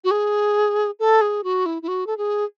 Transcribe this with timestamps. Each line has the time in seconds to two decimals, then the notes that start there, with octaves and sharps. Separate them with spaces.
0.04 F#4
0.11 G#4
0.99 A4
1.21 G#4
1.44 F#4
1.66 E4
1.82 E4
1.88 F#4
2.07 A4
2.18 G#4